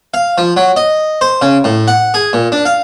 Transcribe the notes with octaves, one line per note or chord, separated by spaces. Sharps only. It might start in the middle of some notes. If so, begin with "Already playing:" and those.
F5
F3
F#3
D#5
C5
C#3
A2
F#5
G#4
A#2
D4
F5